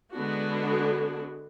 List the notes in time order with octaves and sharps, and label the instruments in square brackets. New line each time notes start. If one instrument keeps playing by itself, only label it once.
[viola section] D3 G#3 B3 D4 F#4